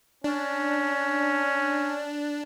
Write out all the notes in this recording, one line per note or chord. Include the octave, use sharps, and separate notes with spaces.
C#4 D4